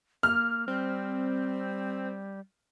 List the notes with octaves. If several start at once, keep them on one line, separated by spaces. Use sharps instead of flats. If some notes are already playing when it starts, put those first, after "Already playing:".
A#3 F6
G3 C4